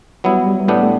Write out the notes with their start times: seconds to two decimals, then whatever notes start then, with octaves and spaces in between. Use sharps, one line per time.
0.24 F#3 G3 B3 E4
0.46 G3
0.68 A2 G3 A3 B3 D4
0.83 A3